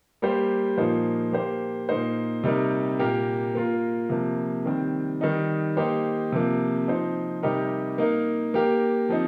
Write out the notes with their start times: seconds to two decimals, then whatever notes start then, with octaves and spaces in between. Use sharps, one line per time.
0.22 G3 A#3 G4 C5
0.77 A#2 F3 A#3 D#4 C5
1.33 A#3 G4 C5
1.89 A#2 A#3 D#4 C5
2.43 C3 G3 D#4 A#4
2.99 A#2 A#3 G4 A#4
3.55 A#3 F4 A#4
4.09 C3 F3 A#3
4.65 D#3 G3 C4
5.21 D#3 G3 D#4
5.77 A#3 D#4 G4 C5
6.32 C3 F3 A#3
6.87 F3 C4 D#4 C5
7.43 C3 G3 D#4 G4 A#4
7.98 A#3 D#4 A#4
8.54 A#3 G4 A#4
9.09 F3 C4 D#4